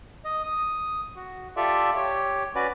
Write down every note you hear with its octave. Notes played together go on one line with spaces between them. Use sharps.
D#5
D#6
F#4
F4 G4 A4 D5 E5
G4 C#5
C#4 F#4 B4 D5